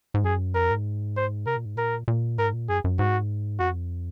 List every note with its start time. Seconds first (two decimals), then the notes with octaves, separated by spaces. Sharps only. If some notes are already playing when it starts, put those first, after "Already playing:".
0.14 G#2
0.24 F#2 G#4
0.55 F2 A#4
0.71 G#2
1.17 C5
1.46 C3 A#4
1.57 A#2
1.65 G#2
1.76 A#2 A#4
2.08 A#2
2.38 G#2 A#4
2.54 A#2
2.69 F#2 G#4
2.84 F#2
2.99 G#2 F#4
3.60 F2 F#4